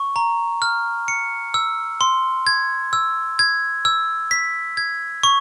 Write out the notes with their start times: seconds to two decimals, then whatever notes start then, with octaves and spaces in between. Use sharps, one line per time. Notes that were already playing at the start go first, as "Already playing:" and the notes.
Already playing: C#6
0.16 A#5
0.62 F6
1.08 C#7
1.54 E6
2.01 C6
2.47 G#6
2.93 E6
3.39 G#6
3.85 E6
4.31 B6
4.77 G#6
5.23 C#6